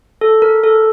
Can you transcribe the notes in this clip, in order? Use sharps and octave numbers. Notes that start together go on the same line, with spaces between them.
A4
A#4
A4